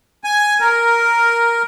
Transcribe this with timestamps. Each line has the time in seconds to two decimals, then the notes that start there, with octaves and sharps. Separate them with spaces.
0.24 G#5
0.60 A#4